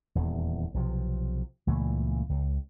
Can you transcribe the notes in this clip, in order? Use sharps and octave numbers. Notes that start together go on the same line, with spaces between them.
D#1 E2
B1 C3 F3
C#2 A#2 E3 A3
C#2